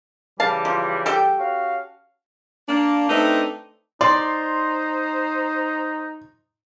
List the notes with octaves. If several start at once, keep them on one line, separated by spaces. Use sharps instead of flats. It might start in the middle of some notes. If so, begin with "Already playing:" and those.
C#3 E3 G3 F5 A5
F3
G4 A4 G5
C#4 F#4 F5
A#3 D4
A3 C4 D4 D#4 B4
D#4 C5 D5 C6